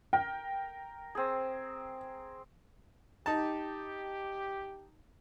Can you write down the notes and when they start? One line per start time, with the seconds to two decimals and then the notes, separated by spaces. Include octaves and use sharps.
0.13 A#4 G5
1.15 C4 G#4
3.26 D#4 G4 A5